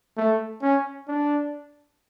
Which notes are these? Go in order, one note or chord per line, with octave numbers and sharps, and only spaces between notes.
A3
C#4
D4